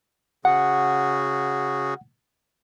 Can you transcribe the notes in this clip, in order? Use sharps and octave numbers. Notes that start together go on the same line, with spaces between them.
C#3 F#4 G#4 F#5